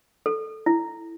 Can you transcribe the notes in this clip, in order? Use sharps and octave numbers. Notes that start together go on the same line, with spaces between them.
A4
E4